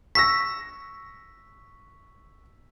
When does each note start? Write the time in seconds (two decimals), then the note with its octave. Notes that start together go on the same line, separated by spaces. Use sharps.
0.15 C#6 E6 A#6 B6